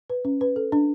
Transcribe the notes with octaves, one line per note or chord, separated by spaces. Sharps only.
B4
C#4
B4
A4
D4